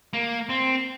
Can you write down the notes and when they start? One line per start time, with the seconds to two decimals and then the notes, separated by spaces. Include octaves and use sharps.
0.13 A#3
0.49 C4